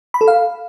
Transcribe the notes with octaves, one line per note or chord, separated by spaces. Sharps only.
B5
A4
F5